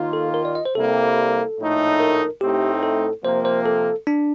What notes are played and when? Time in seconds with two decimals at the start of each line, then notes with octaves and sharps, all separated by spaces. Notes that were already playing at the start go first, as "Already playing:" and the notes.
Already playing: D#2 D#3 A#3 F4
0.13 A4
0.34 A#4
0.45 D5
0.55 D#5
0.65 C5
0.75 C2 C3 G3 A#3 A4
1.58 A#1 A2 A3 D#4
2.00 A#4
2.41 A2 A3 C4 D#4 G4
2.83 A4
3.24 C3 F3 A#3 C5
3.45 C5
3.66 A4
4.07 D4